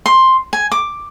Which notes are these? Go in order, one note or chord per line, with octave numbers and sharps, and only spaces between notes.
C6
G#5
D6